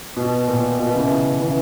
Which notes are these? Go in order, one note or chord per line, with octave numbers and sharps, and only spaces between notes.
B2
A#2
B2
C#3 E3
C#3 E3